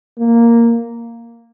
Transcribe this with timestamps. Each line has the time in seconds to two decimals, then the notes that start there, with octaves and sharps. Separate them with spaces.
0.19 A#3